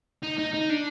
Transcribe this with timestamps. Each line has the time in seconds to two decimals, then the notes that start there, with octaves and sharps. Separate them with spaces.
0.23 D#4
0.39 D#4
0.54 D#4
0.70 D4